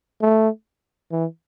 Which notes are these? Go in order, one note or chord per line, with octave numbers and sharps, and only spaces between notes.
A3
E3